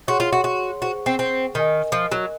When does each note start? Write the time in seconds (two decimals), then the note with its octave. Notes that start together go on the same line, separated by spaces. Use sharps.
0.08 F#4 G#4 C#5 F#5 C6
0.20 F4
0.33 F#4
0.44 F#4
0.81 F#4 G#4 C5 F#5 C#6
1.06 C4
1.19 C4
1.55 D#3 A#4 D#5 G#5
1.92 F3
2.12 F#3